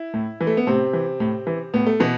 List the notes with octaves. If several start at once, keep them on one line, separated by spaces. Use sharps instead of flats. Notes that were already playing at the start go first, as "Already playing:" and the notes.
Already playing: E4
A2
E3
A3
B3
A2 C3 C4
E3
A2
E3
A2 B3
A3
B2 E3 B3